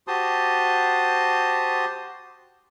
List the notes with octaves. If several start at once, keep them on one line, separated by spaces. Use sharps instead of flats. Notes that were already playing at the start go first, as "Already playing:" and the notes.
F#4 G4 C5 A5 C6 D#6